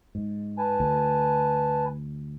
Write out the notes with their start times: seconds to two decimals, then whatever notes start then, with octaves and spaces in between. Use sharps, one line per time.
0.15 G#2
0.58 B4 G#5 A5
0.80 D2